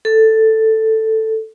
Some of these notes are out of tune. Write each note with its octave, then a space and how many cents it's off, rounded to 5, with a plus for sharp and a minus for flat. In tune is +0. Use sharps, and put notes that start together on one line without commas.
A4 +5